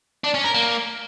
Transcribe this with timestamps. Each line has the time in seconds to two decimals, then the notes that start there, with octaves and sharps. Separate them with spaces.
0.24 D4
0.34 C#4
0.44 A#4
0.54 A#3